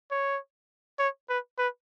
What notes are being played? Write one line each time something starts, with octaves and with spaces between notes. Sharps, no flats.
C#5
C#5
B4
B4